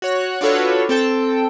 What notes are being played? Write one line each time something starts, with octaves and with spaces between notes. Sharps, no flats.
F#4 C#5 F#6
D4 F4 F#4 A4 B4 C#5
C4 A4 G5 A5